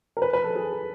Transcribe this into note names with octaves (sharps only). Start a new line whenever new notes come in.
A#4
B4
B4
A4
G#4